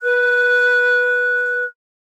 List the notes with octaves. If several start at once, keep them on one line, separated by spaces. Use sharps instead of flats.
B4 F#6